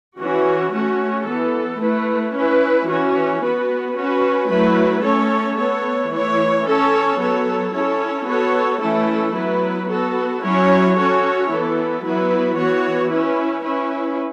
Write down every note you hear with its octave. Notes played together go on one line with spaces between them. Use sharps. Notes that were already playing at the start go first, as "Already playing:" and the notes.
E3 C#4 F#4
A3 C#4 F#4
E3 B3 A4
A3 E4 B4
C#4 E4 B4
E3 C#4 F#4
B3 F#4 B4
C#4 F#4 B4
F#3 A3 E4 B4
A3 C#4 A4 C#5
B3 A4 C#5
E3 A3 E4 C#5
C#4 A4 C#5
F#3 B3 A4 C#5
C#4 E4 A4 C#5
B3 F#4 A4 C#5
E3 A3 C#4 E4 A4
F#3 B3 E4 B4
B3 F#4 A4
F#3 C#4 E4 C#5
C#4 F#4 A4 C#5
E3 B3 E4 A4
F#3 B3 E4 B4
E3 B3 F#4 C#5
C#4 E4 B4
C#4 E4 B4